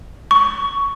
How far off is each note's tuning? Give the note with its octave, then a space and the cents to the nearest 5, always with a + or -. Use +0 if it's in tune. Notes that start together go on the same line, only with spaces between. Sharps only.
C#6 +15